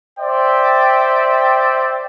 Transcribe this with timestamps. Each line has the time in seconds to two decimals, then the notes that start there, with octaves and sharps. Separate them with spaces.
0.19 C5 D5 E5 G5